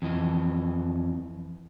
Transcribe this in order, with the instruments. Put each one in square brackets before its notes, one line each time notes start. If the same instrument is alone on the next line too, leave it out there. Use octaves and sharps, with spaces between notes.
[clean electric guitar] F2 E3 D#5